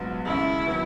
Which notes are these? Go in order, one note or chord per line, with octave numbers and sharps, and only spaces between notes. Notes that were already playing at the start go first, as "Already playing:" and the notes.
Already playing: A#1 G#2 F#3 B3
D#2 C#3 G#3 E4
D#3 F#3 B3